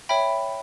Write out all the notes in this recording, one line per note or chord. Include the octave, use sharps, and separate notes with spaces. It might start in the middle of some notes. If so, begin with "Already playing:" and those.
C#5 E5 G5 B5